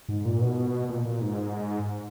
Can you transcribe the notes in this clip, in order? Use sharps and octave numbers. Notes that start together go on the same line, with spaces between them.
G#2
A#2
B2
A#2
A#2
G#2